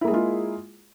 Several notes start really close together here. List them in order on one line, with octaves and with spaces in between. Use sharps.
E4 A#3 G#4 G#3 F4